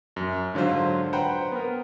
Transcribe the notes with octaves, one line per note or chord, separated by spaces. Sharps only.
F#2
G#2 D3 F#3 F4 C5
B4 C5 F#5 G5 A#5 B5
B3 A#4